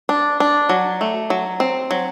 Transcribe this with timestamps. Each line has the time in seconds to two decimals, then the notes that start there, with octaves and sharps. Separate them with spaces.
0.09 D4
0.40 D4
0.69 F#3
1.01 A3
1.30 F#3
1.60 C4
1.91 F#3